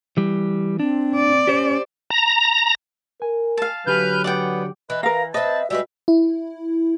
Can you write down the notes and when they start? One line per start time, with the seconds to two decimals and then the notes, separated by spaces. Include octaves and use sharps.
0.17 E3 G3
0.80 C4 D4
1.15 D5
1.47 C#4 G4 C5
2.10 A#5
3.22 A#4 G#5
3.57 F5 A5
3.87 D3 F#3 G4 B4 G#5 F6 G6
4.24 B3 D5 F#5 G5
4.90 E3 B4 D#5
5.03 A#4 B4 F5 A#5
5.34 C4 B4 D#5 E5 A5
5.70 G3 G#3 F#4 B4 E5
6.08 E4